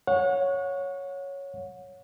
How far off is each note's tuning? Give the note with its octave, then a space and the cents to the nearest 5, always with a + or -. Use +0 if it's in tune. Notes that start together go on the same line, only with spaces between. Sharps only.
C#5 +0 F#5 -30